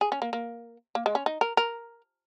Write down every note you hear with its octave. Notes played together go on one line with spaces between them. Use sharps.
G#4
C#4
A#3
A#3
A#3
G#3
C#4
D#4
A#4
A#4